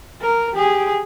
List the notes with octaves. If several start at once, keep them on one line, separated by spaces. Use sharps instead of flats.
A#4
G4 G#4